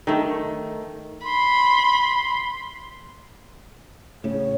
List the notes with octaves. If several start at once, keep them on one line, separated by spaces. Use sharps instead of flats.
D#3 A3
B5 C6
A2 C#3 C#5